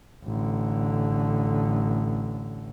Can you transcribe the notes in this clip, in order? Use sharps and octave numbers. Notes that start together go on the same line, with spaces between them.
A1 D3